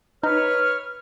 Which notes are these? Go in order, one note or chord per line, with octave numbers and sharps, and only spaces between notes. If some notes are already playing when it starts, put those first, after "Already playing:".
D#4 B4 C#5 F6